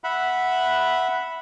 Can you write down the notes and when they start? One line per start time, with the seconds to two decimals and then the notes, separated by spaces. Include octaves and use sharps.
0.04 E5 F#5 B5